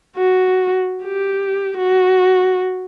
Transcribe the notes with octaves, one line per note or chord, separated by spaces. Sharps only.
F#4
G4
F#4